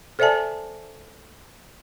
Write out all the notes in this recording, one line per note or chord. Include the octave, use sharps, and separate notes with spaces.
A4 C5 D5 E5 G#5 A5